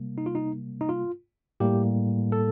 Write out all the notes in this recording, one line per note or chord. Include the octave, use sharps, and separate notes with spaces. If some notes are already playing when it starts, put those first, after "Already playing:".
Already playing: C3 G3 A#3
D#4
F4
D#4
D#4
F4
A2 G3 A#3 G4
A4